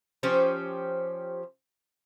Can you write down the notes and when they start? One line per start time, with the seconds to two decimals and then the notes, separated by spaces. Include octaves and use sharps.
0.23 F3 C#4 G4 C5